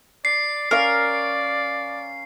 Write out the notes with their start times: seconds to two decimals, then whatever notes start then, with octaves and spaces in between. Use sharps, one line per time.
0.25 D5 C7
0.71 C#4 A#4 D5 F5